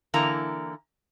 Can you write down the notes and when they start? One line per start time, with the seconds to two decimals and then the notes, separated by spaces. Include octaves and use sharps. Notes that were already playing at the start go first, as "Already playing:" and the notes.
0.14 D3 E3 A#3 E4 A#5